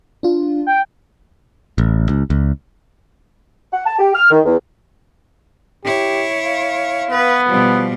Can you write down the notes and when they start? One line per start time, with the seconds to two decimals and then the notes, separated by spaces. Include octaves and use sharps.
0.23 D4 F4
0.67 G5
1.78 A1
2.09 C#2
2.30 C#2
3.73 F#5
3.86 A5
3.99 G4
4.15 F6
4.31 D#3
4.45 E2
5.84 E4 G4 C#5
6.45 F5
7.11 B3 B4
7.49 B2 F3 G3